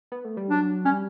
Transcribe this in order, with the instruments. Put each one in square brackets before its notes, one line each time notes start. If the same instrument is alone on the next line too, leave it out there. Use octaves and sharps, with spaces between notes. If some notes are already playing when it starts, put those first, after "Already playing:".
[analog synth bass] B3
A3
G3
[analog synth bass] F#3 [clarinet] D4
[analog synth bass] G3 [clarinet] C#4